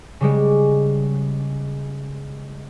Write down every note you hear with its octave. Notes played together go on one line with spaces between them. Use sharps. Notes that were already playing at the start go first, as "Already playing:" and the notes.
C#3 G3 G#3